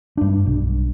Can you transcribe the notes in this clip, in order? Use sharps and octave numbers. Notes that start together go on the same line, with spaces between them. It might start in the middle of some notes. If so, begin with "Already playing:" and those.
G2 D4
B1